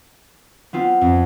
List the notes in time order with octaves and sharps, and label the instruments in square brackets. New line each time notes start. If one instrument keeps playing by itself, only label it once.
[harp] B3 C4 F4
[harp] F2 [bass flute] C4